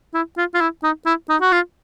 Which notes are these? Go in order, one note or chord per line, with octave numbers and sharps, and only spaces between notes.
E4
F4
F4
E4
D#4
E4
D#4
F#4
F4